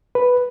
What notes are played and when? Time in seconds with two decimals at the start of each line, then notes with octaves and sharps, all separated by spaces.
0.15 B4